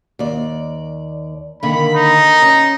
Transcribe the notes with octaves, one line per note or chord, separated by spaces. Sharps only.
D#2 D5
D3 D#3 A#3 B5
D#4
C#4